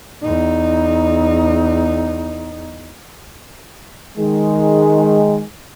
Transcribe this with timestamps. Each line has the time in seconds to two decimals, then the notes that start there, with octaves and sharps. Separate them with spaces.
0.23 E2 D#4
4.17 D#3 G#3